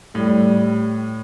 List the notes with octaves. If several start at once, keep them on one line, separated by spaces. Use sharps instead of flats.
A2 G3